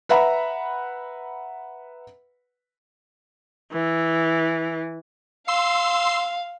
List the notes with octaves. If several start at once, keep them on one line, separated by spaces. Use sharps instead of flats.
B4 E5 F#5 A#5 B5
E3
F5 C6 E6 C7